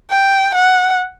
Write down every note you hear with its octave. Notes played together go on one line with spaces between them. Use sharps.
G5
F#5